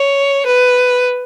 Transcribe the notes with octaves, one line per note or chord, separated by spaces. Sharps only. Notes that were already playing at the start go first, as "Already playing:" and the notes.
Already playing: C#5
B4